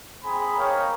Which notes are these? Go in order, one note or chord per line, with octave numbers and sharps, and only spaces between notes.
C4 G#4 G#5 A#5 B5
A#3 D#4 A#4 C#5 F5 G5